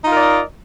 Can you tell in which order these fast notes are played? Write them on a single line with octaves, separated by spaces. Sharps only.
D#4 F4 A#4 D5 D#5